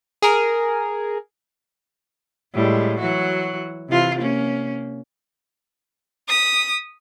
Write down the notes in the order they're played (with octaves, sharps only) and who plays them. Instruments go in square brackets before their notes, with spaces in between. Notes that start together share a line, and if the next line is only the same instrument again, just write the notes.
[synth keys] G#4 A#4
[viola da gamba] A2 G3 G#3
E3 F#3 F#4
C3 E3 F4
A#3 C#4
[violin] D#6 B6